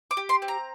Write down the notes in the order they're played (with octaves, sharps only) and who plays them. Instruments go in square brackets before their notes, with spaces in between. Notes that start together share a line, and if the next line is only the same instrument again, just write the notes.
[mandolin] D6
G4
C6
C4
A#5